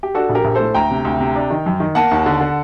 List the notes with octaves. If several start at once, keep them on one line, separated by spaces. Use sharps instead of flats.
G4
D4 F#4 A4
A#1
G4 A#4
A#1
A2 A4 C5
D2 G5 A#5
C3
D2
C3
D4
D#3
F#2
D#3
A#3 F#5 A5
D#2
D3
D3